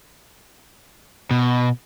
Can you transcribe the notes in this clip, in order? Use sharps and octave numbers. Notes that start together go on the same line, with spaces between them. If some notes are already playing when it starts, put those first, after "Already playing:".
B2